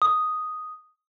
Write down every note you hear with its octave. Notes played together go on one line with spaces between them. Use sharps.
D#6